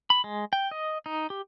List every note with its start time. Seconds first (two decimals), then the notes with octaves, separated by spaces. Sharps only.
0.10 B5
0.24 G#3
0.53 G5
0.71 D#5
1.06 D#4
1.30 G4